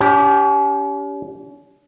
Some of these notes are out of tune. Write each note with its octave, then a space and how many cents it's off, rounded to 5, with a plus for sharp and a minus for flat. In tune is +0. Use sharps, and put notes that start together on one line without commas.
C#4 +45 G4 +0